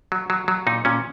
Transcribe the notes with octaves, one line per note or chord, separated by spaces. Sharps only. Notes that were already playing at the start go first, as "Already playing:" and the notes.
F#3
F#3
F#3
A#2 D#4
A#2 C#4